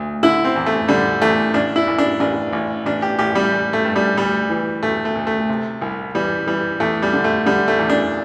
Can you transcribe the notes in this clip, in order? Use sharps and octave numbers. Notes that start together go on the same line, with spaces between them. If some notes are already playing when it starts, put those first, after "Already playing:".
Already playing: D2
D3 E4
C4
E2
A3
D3 G3
E2 A3
A1 D4
E4
A1
D4
A1 D4
A1
A1 D4
G4
A1 G4
G3
A1
A3
G2
G3
D2 G3
E3
D2 A3
A3
D2
A3
C3
C2
E3 G3
E3 G3
E2 A3
G3
D3
A3
D3 G3
A3
E2
D4